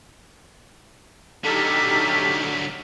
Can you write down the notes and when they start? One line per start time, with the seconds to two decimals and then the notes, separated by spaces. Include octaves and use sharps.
1.44 D3 F#3 D#4 G4 A4 F6 B6